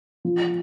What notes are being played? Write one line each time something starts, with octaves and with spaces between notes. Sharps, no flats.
F3